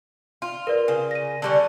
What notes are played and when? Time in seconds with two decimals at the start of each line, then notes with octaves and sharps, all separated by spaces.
0.42 F4
0.67 A#4 B4 D5
0.88 C#3
1.11 A#6 D#7
1.42 D3 G3 C#4 A5 C#6